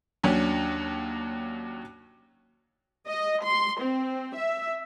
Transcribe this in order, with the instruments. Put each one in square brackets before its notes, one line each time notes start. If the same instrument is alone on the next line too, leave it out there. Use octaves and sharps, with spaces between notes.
[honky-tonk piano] D#2 F#3 C#4 D4
[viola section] D#5
C6
C4
E5